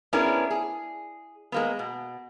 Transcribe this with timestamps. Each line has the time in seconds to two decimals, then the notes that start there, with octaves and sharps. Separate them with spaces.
0.13 B3 C#4 D4 E4 G#4 A#4
0.51 G#4
1.52 G#3 A#3 B3
1.79 B2